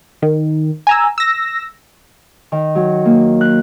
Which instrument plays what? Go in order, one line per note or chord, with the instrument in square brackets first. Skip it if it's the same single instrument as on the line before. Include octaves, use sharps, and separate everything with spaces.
[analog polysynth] D#3
G#5 A#5 E6
E6 A#6
[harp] D#3
F#3
A#3
F#6